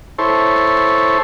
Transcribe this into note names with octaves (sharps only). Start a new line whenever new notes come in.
E4 A4 C5 C#5